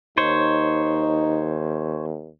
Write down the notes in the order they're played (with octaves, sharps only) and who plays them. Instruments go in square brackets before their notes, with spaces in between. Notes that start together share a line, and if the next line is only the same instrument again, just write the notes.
[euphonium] D#2 [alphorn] D#4 [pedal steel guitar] C5 C#5